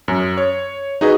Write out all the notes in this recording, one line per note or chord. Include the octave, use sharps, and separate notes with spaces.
F#2
C#5
D#4 F#4 G#4 B4 D#5